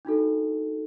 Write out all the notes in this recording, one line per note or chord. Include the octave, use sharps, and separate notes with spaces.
D4 D#4 F#4 A4